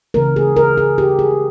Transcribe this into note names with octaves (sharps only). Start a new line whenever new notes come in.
C#3 E3 A#3 A#4
G#4
A#4
G#4
G4
G#4